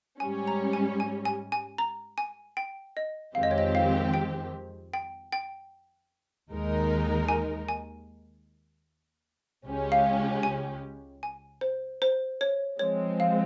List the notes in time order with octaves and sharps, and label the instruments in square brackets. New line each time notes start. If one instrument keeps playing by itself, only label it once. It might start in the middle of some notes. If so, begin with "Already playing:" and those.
[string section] G#2 G3 C#4 [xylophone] G#5
[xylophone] A#5
G#5
G#5
G#5
G#5
A#5
G#5
G5
D#5
[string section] F2 D#3 G#3 C4 G4 [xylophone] F5
[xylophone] D#5
C#5
D#5
F5
G5
G5
G5
[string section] D#2 D#3 G#3 D#4 A#4
[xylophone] G#5
G#5
[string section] C#2 C#3 G#3 C#4 G4
[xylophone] F5
G#5
G#5
C5
C5
C#5
[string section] F3 G#3 C4 [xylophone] C#5
[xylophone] F5